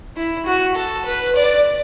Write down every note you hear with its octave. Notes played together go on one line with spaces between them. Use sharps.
E4
F#4
A4
B4
D5